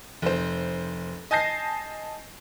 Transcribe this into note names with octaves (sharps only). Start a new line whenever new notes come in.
F1 C5
D#5 G#5 A5 G6 A#6 C7